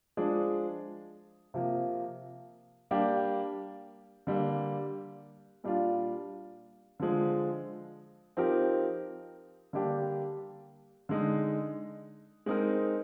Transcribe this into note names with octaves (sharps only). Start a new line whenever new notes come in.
F3 G#3 D4 G#4
C3 F3 A#3
G3 A#3 D4 G4
D3 G3 A#3
A#2 G3 D4 F4
D3 F3 G#3
F3 C4 D#4 G4 A#4
D3 G3 A#3 D4 G4
D3 G#3 D#4
G#3 C4 D#4 A#4